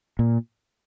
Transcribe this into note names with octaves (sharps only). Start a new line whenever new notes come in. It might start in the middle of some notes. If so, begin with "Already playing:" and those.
A#2